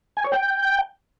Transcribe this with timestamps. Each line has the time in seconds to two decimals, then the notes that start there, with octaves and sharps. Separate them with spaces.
0.17 G#5
0.24 C#5
0.32 G5